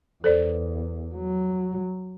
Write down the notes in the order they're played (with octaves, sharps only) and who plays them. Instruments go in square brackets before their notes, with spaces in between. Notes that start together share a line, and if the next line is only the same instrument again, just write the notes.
[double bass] E2 [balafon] A4 C5 D5
[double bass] F#3